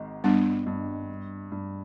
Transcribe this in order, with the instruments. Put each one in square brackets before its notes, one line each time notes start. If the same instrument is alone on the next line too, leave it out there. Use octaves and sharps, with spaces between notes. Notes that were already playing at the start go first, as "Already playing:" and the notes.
Already playing: [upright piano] G#1 G#2
[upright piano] G2 [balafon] G3 B3 D4
[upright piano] G2
G2